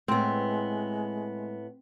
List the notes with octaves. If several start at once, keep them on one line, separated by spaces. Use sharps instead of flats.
A2 G#3 B3 C4